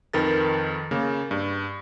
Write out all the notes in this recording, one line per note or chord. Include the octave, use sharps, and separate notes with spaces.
F2 D#3 A#4 B4 A6
C#3 A#3
G2